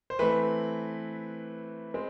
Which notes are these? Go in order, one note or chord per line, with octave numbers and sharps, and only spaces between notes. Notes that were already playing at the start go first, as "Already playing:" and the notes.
C5
E3 A3 C4 B4
G#3 C4